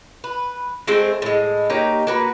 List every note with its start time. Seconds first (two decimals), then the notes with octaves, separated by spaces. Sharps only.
0.24 B4
0.88 G#3 A3 C4 C5
1.22 A2 G#3
1.70 A#3 D#4 G4 C#5
2.07 A#3 F#4 B4